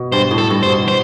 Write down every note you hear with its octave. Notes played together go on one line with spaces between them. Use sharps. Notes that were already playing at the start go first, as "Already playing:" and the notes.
Already playing: B2
G2 C5
A2
A4
G2
C5
B2
C5